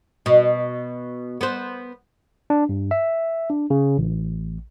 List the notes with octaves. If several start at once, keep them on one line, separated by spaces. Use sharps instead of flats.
B2
B3 C5
D4
G2
E5
D4
C#3
A1